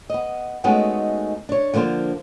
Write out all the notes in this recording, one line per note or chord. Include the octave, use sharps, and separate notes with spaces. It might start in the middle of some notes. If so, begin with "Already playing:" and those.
B3 D#5
G#3 A3 B3 C#4 D#4 F#4
D4 C#5
D3 F3 A#3 D4 C5